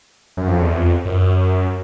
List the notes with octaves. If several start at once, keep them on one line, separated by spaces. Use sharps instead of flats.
F#2
F2
E2
F2
F#2